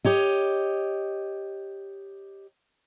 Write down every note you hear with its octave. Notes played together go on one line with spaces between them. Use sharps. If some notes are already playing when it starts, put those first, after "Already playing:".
G4 C#5 D#5